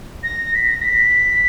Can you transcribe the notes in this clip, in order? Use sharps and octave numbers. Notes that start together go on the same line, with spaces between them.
A#6
B6
A#6
B6